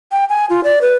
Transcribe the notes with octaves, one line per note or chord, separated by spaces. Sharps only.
G5
G#5
F4
D5
B4